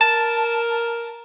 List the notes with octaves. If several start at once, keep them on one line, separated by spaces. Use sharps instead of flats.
A#4 A5